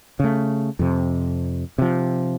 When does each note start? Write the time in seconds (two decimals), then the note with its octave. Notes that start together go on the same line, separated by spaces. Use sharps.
0.20 C#3 A3
0.79 F2 C3
1.78 C3 F3